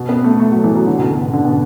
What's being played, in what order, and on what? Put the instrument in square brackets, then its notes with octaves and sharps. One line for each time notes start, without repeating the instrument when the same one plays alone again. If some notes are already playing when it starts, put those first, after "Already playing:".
Already playing: [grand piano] B2
B3
A3
A3
F#3
E3
F#3
D3
B2
B2
B2
D3
B2